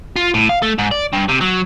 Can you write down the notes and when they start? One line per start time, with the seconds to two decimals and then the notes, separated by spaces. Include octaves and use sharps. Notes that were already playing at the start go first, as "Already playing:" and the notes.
0.16 F4
0.34 A2
0.49 F5
0.62 A3
0.78 G#2
0.92 D5
1.13 G2
1.29 C3
1.41 F#3